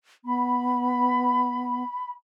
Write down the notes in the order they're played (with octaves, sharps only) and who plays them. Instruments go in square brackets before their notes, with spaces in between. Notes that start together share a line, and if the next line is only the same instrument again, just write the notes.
[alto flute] B3 [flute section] B5